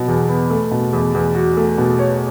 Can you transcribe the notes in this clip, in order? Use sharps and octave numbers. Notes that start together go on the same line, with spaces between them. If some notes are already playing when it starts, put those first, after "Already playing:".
Already playing: B2 F#3
E2
B3
A3
B2
E2
E2
F#4
A3
B2
C#5